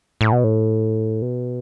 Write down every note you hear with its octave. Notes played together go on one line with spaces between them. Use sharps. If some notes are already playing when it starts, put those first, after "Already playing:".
A2
B2
A2
B2